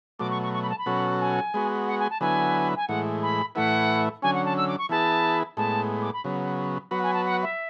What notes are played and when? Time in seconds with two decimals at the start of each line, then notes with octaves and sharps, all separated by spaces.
0.19 B2 F#3 A3 D6
0.30 C#6
0.42 C#6
0.53 C#6
0.62 B5
0.69 A5
0.78 B5
0.86 B2 F#3 C#4 F#4 A4
1.20 G#5
1.54 G#3 B3 F#4
1.87 F#5
1.99 G#5
2.10 A5
2.20 D3 F#3 B3 E4 B4 G#5
2.76 G#5
2.87 A2 E3 G#3 F#5
3.22 B5
3.55 A2 E3 A3 E4 B4 F#5
4.22 D3 F#3 C#4 G#5
4.34 F#5
4.45 A5
4.56 E6
4.67 D6
4.78 C#6
4.89 E3 B3 E4 G#4 B4 A5
5.57 A2 G#3 B3 A5
6.02 D6
6.13 B5
6.24 C#3 F#3 B3
6.91 F#3 B3 F#4 B4 F#5
7.03 G#5
7.13 A5
7.24 F#5
7.42 E5